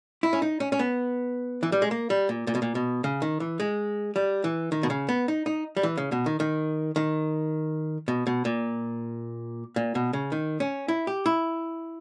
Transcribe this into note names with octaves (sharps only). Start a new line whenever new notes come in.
E4
C#4
D#4
C#4
C#4
B3
E3
G3
G#3
A#3
G3
A#2
A#2
B2
A#2
B2
C#3
D#3
E3
G#3
G3
E3
D#3
B2
C#3
B3
D#4
D#4
G3
E3
C#3
B2
D#3
D#3
D#3
B2
B2
A#2
A#2
B2
C#3
D#3
C#4
E4
G4
E4